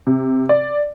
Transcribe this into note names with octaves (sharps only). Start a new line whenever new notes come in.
C3
D5